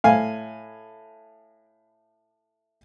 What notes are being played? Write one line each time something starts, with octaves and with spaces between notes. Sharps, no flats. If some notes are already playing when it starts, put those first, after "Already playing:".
A2 F5 G#5